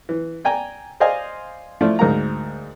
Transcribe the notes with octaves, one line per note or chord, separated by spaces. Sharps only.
E3
D5 G5 G#5 A#5
C5 D5 D#5 F5 G#5
F3 A3 E4 F4 D5
D2 G#2 A#4 F5 A#5